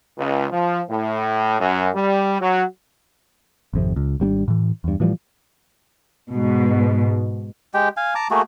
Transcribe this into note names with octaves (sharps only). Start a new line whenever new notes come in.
C#2
F3
A2
F#2
G3
F#3
G#1 F2 C3
C#2
G#1 G3 C4 D4
A2 E3
E2 G2
A2 E3 F3 G3
G#2 B2
G#3 G4 G5
F5 G#5
A5 A#5 D6
A3 A#3 F#4 G#4